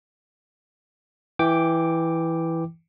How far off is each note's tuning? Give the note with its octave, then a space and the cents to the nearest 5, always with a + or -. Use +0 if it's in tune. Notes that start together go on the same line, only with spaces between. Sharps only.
E3 +0 G5 +0 D6 +0